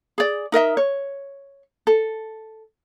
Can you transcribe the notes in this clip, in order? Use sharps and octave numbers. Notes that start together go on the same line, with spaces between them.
G#4 D5
D#4 A#4 D#5 E5
C#5
A4